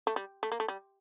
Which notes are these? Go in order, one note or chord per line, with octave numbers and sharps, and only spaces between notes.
A3
G3
A3
A#3
A3
G3